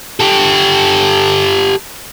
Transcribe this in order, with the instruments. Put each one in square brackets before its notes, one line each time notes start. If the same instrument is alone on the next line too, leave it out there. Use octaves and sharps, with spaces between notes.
[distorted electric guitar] G4 A4